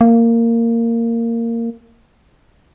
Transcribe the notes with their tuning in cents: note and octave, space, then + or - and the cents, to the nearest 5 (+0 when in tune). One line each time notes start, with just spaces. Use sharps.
A#3 -15